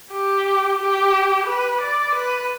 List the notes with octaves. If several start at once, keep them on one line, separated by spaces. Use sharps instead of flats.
G4
G4
B4
D5
B4